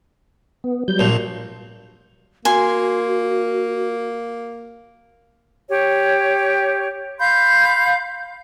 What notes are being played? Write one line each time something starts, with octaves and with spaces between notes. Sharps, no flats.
B3
F#3 G3 G6
A#1 A#2
A#3 F#4 G#5 C6
G4 C#5
F5 B5 C6 G6